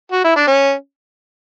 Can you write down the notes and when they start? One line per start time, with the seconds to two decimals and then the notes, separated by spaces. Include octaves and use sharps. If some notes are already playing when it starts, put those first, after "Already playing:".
0.12 F#4
0.24 E4
0.36 D4
0.48 C#4